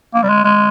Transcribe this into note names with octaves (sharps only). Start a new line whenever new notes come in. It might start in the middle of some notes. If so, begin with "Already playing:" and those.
A#3
G3
G#3
G#3